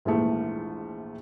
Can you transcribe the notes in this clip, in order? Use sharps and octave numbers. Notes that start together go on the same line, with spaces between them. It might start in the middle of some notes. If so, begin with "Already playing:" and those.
A#1 D#2 G#2 E3 A3